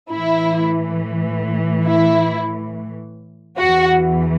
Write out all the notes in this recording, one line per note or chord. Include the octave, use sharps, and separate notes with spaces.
A2 E3 E4
E4
E2 E3 F#4